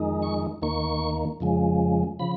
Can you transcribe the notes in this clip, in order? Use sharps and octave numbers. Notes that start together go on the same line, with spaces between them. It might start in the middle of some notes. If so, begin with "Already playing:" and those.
Already playing: F2 D#3 G#3 D#4
C#6
D#2 D#3 A#3 C#6
F2 C#3 F3 G#3
C#3 F3 B5